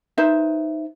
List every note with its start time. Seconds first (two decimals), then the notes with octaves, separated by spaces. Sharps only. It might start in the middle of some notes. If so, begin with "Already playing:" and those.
0.18 D#4 B4 C5 E5